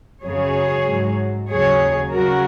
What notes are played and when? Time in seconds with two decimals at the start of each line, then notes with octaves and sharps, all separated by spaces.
0.24 F#2 C#3 F#3 G#4 C#5
0.88 G#2 F#3
1.50 D#2 C#3 F#3 G#4 C#5
2.13 C#3 F#3 F#4 A#4